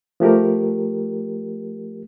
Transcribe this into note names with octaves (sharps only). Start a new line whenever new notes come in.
F3 A3 G4 A#4